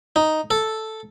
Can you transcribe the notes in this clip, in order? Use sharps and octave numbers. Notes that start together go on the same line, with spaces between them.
D#4
A4